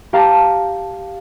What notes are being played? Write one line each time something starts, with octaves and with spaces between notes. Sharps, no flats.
G4 F5 A5 A#5 D6 G6